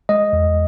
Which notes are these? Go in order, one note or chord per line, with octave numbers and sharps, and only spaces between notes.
G#3 D#5
E2